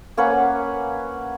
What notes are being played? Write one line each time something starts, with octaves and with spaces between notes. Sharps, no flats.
A#3 C#4 B4 F#5